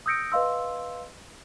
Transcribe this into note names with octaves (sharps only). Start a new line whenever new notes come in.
D#6 E6 G6 A#6 C#7 D7
B4 D#5 F5 C6 E6